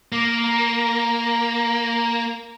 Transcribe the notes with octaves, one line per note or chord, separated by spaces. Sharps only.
A#3 D6
A#5